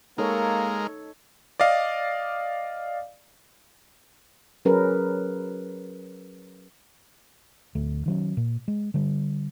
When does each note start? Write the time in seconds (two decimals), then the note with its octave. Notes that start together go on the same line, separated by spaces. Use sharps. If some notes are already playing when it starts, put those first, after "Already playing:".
0.18 G#3 A#3 D#4 A4 A#4 C#5
1.60 D5 D#5 F5
4.65 F#3 C#4 G#4 A#4 B4
7.75 D1 D2 A3
8.06 D#3 F#3 C#4
8.37 A#2
8.68 G#3
8.94 D3 G3